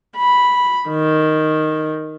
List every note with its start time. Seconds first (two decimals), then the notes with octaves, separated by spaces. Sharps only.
0.17 B5
0.90 D#3